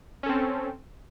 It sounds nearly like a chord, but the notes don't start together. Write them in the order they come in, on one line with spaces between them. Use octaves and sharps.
C#4 A4 C4